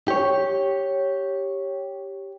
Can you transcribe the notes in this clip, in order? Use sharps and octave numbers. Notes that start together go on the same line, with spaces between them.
G4 C#5